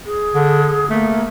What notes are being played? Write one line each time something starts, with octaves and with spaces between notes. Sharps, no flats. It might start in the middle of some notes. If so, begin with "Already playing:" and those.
G#4
D3
A3 A#3